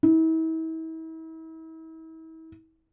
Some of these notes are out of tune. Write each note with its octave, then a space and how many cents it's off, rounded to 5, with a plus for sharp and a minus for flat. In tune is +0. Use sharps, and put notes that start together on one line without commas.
E4 -40